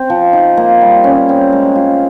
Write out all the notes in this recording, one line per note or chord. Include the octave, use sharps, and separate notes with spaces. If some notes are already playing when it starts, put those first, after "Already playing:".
Already playing: C4
F3
D#4
A#3
G3
C#4
C4
G#3
F4